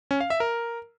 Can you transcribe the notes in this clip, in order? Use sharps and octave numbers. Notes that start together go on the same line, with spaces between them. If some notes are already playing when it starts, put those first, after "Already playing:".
C#4
F5
E5
A#4